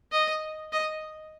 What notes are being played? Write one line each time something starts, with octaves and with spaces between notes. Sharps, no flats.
D#5
D#5